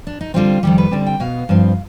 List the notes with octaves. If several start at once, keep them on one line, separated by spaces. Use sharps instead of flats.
D4
D#4
D3 G3 C4 F4
F2 D#3 G3 G4
B4
D3 G3 C4 D5
G5
B2 B3 F5
G2 F3 C4